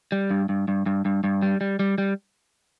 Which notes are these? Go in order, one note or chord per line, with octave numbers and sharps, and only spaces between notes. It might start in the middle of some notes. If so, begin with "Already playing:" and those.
G3
G2
G2
G2
G2
G2
G2
G3
G3
G3
G3